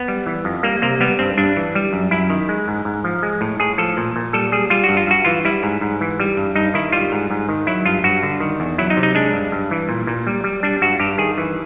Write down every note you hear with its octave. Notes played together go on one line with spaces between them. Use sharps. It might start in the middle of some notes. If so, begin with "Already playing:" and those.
Already playing: B3
G3
E3
F2
G3 A#3
C3 A#3
G3 B3
G2 C4
G2 D4
E3
G3
F#2
F#2 E4
D#3
G#3
G#2
G#2
F3
G#3
A2
A2 G#4
F3 A4
A#2
A#2
G3 A4
G3 G#4
G3 F4
F#4
G2
F4
G2 F#4
E3 F4
G3 E4
G#2
G#2
E3
G3
G2
G2 D#4
D#3 E4
G3 F4
G#2
G#2
D#3
F#3 E4
G2 F4
G2 F#4
D3
D#3
E2
F#3 E4
D#4
C3
D#4
G#3 D4
G2
G2
E3
A#2
A#2
G3
G3
G3 D4
G2 F#4
G2 G4
D#3 G#4
E3